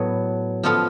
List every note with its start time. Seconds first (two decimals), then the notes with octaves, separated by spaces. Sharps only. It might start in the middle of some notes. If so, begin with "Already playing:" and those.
Already playing: A2 F#3 B3
0.63 F3 B3 F4 A4